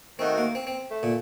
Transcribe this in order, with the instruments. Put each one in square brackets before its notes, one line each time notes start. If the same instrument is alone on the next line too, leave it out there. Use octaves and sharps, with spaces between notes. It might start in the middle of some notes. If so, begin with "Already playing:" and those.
[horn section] D#3 A3 D#4 F#4 [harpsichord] C4
[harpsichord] A#3
C4
C4
[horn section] A3
[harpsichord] A#2